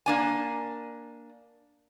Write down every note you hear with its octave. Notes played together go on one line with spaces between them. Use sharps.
A#3 D4 G#5